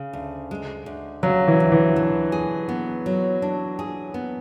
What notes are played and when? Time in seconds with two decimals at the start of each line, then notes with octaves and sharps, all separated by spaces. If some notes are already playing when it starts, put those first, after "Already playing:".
Already playing: C#3
0.13 D2
0.51 G#3
0.86 D2
1.23 C#3 F#3
1.48 E3
1.60 D2
1.72 E3
1.96 D4
2.32 G#4
2.69 B3
3.06 F#3
3.42 D4
3.79 G#4
4.14 B3